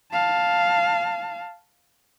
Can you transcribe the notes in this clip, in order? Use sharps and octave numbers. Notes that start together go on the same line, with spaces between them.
F5 A5